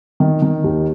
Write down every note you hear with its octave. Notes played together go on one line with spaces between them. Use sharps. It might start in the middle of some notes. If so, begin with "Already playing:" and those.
D#3
D#3
D#2